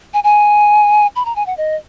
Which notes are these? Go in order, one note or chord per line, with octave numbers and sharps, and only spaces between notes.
G#5
G#5
B5
A#5
G#5
F#5
D#5